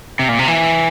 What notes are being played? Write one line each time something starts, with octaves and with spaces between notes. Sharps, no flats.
C3
A#2
C3
E3